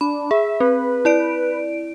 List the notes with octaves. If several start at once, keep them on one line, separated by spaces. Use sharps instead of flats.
D4 B5
G#4 E5
C4 B4
E4 D5 D7